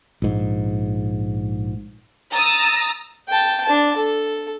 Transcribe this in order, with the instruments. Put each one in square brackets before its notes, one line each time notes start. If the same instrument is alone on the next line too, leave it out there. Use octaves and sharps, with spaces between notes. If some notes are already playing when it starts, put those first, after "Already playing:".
[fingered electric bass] A#1 G#2
[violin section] A#5 D#6 E6 A6
[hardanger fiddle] G5 A5
D4 A5
A4